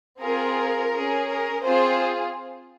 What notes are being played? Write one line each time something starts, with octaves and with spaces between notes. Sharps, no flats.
C4 F4 G#4 A#4
C#4 G#4
A#4
C4 F4 G#4 C5